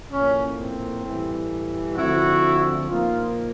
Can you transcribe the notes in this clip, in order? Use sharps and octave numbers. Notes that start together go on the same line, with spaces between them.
A2 F3 A#3 C#4
C4
A2 E3 G3
D3 F3 A3 C4 E4 F#4
A#2 F3 A#3 D#4 F4